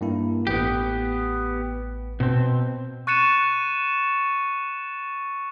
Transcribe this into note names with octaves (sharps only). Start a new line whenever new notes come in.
G2 A#3 E4
A1 B3 G4 B4
B2 C4
C#6 F#6 A6 C#7 D#7 E7